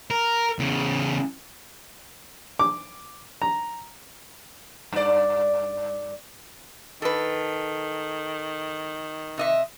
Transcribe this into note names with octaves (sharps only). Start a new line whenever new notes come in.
A#4
E2 C#3
D6
A#5
G2 D5
D#3 A4 B4
C3 D#5 E5